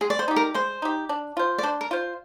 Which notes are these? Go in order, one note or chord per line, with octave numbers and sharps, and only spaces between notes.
G#3 G#4
D5
C5
D#4 G4
A#4
G#3 C5
D#4 G4
D4
F4 C5
D5
D4 C5
A#4
F4 C5